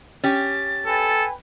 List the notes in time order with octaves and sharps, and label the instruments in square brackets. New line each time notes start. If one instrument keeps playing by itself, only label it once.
[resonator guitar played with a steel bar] C#4 G4 [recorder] A6
[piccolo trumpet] A4 [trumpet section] B4 G5 G#5